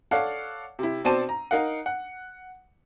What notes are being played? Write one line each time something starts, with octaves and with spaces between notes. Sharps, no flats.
A4 C#5 D5 F5 F#5
C3 E4
B2 C4 C5 D5 A5 D#7
A#5
D#4 A#4 F5 F#5
F#5